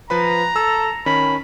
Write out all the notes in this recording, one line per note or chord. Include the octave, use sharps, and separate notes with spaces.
F3 B4 A#5 B5
A4 E6
D#3 C#4 B5